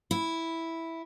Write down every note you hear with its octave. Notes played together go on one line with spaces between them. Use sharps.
E4